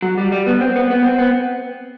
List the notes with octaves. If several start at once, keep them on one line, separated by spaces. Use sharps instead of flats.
F#3
G3
G3
B3
C4
B3
B3
C4
B3